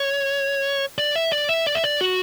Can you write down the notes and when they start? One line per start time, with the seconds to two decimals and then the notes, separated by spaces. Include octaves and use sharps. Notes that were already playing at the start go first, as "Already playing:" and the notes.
Already playing: C#5
0.98 D5
1.16 E5
1.32 D5
1.49 E5
1.67 D5
1.75 E5
1.84 D5
2.01 F#4